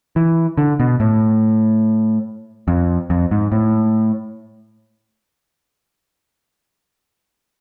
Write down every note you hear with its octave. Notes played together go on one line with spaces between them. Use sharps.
E3
D3
B2
A2
F2
F2
G#2
A2